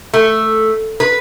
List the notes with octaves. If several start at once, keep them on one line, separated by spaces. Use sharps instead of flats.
A3
B4